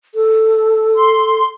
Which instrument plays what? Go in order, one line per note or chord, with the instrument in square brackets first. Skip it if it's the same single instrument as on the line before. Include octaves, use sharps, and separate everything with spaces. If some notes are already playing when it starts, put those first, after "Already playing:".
[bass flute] A4
[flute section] C6